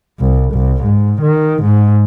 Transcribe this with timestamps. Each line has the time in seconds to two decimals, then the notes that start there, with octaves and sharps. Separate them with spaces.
0.20 C2
0.53 C2
0.84 G#2
1.22 D#3
1.63 G#2